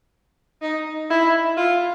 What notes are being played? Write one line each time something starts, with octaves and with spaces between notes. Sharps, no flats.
D#4
E4
F4